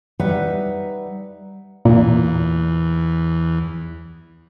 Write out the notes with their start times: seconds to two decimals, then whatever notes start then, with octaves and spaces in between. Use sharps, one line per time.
0.19 G3 D#4 B4 E5 F#5
1.85 E2 A#2